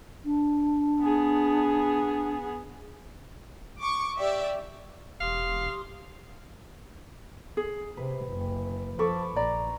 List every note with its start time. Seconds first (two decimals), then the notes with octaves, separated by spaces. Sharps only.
0.25 D4
1.00 B3 G#4
3.79 C#6 D6
4.18 G4 D5 E5
5.21 E1 G4 F5 C6 D#6
7.57 G#4
7.97 C3 B4
8.27 F#1
8.99 F3 A4 B5 C#6 D6
9.36 A#1 D5 A#5